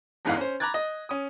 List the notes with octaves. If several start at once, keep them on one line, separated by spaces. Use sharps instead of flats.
G1 E2 G#2 E3 D#5 F5
C#4 C5
A#5 B5 D6 F#6 G#6 A6
D#5
C#4 D#6